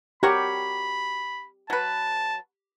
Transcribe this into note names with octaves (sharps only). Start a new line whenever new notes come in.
F#4 G4 A#4 C#5 B5
F#3 B4 A5